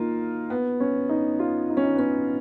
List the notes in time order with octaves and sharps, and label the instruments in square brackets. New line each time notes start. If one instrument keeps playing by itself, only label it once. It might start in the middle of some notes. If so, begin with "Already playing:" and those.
Already playing: [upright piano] A#3 D#4 F4
B3
C#4
D#4
F4
D#4
C#4
D#4
B3
C#4